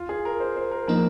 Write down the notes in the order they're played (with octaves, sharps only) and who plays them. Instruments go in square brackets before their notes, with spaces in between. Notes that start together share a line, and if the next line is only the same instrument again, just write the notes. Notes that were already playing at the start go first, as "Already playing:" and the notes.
Already playing: [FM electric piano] D#2 [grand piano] F4
[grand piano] G#4
A#4
C5
C5
A#4
[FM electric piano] F3 A#3 D#4 [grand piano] A#4